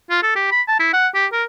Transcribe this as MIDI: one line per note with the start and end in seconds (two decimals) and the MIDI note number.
0.10 0.19 65
0.23 0.33 69
0.36 0.47 67
0.51 0.62 83
0.68 0.77 81
0.80 0.91 64
0.93 1.08 78
1.15 1.26 67
1.33 1.44 70